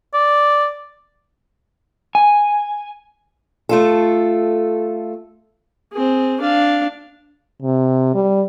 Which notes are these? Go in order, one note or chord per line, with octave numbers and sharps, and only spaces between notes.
D5
G#5
A3 F4 A4
C4 G#4
D4 F5
C3
G3